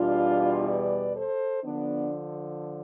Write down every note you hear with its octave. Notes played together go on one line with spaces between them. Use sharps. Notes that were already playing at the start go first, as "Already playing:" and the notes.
Already playing: E2 B2 G3 D4 F4
B4 D5
A4 C5
D3 F3 B3 D4